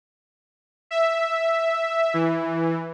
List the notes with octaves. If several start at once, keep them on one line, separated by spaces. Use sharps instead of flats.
E5
E3